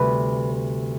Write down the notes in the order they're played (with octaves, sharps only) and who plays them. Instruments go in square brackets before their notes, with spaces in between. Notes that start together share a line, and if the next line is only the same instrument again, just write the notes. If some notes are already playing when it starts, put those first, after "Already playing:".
Already playing: [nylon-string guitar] D2 C3 G3 B4